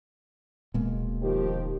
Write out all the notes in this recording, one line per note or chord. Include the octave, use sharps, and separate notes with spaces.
D#1 B2 G#3 A#3
D#3 F3 G4